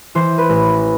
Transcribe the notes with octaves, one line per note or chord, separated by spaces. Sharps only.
E3 C5
B4
A1